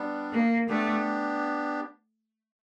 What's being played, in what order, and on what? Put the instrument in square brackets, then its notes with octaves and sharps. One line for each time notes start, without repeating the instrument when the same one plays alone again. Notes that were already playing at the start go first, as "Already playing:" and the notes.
Already playing: [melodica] G3 B3 D4
[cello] A#3
[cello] A3 [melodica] B3 D4 G4